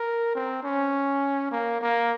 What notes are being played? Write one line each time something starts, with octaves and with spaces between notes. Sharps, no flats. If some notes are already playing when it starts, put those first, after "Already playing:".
Already playing: A#4
C4
C#4
A#3
A#3